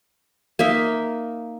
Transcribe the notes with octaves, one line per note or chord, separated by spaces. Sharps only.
A#3 D#4 E5